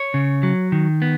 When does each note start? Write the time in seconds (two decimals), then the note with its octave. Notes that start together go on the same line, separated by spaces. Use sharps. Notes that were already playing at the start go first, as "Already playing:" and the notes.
Already playing: C#5
0.14 C#3
0.43 F#3
0.72 D#3
1.02 B3